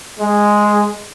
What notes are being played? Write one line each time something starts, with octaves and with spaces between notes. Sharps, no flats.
G#3